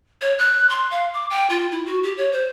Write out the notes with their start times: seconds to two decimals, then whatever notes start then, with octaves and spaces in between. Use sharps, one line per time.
0.21 C#5
0.38 F#6
0.70 C6
0.91 F5
1.14 D6
1.30 G5
1.50 F4
1.72 E4
1.86 F#4
2.03 G4
2.17 C#5
2.32 C5